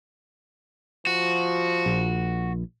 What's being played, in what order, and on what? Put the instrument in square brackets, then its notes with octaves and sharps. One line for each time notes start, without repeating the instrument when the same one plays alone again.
[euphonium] F3 [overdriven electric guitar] F#4
[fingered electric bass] A#1